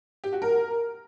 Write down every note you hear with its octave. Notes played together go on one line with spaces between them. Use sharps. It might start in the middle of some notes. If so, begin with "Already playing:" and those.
G4
F#4
A#4